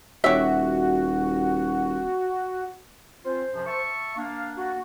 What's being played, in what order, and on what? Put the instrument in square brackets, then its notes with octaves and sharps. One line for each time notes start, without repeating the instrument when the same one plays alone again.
[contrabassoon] D#1 [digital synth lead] F#4 [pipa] G4 C#5 E5
[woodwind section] C4 C#4 F4 [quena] C5
[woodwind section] F#2 C3 F3
E5 A5 C#6
[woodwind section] A#3 D4 [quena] F5
[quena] F#4